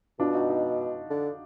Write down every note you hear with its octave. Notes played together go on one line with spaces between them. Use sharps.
B2 D4 F4
D#4 F#4
D#4 F#4
D3